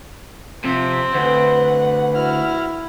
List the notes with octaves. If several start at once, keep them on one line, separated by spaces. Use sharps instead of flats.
C3 F3 C4
D2 B4 F#5
E4 F#4 F6